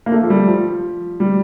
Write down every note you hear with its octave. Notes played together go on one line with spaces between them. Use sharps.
A#3
A3
F3
G3
F3
G3